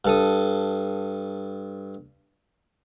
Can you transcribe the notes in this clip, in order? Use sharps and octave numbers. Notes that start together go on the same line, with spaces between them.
G2 A4 D#6